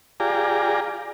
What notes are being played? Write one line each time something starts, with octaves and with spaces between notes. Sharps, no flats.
F4 G4 G#4 D5 A#5